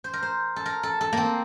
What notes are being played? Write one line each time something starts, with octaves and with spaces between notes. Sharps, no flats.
C5
A#4
C5
A4
A#4
A4
A4
A#3 C4